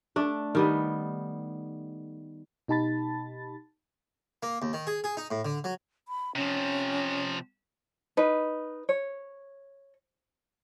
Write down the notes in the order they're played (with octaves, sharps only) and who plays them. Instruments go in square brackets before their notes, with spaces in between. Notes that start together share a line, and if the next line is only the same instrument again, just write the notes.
[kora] A3 D4
D#3 G3 B3
[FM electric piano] B2 D#4 G4 A5 B5 A6
[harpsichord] A#3
D#2
D#3
G#4
G#4
D#4
A2
D3
F#3
[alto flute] B5
[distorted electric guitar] C3 F3 [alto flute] C#4
[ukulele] D#4 B4
C#5